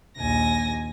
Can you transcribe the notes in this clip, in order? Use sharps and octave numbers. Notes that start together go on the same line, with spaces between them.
A#1 D#2 G#5 A#6